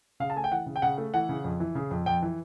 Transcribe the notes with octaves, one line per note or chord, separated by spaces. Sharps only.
C#3 F5
A5
A3 G#5
G5
E3 F#5
C#3
G5
C#3 F#5
A3
E3 F#5
C#3
F2
E3
C#3
F2
F2 G5
E3